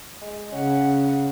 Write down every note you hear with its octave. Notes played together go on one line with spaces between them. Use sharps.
G#3
C#3 C#4 F#5